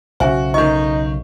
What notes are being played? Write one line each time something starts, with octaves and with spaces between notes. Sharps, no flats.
B1 C#3 C#4 F#4 C5 E5 G#5
D#3 D#4 D#5 C#6